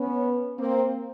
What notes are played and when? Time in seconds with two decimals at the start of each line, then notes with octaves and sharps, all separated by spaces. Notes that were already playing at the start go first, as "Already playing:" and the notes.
Already playing: B3 C#4
0.58 A#3 C4